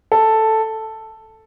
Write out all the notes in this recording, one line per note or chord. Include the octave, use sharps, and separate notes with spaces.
A4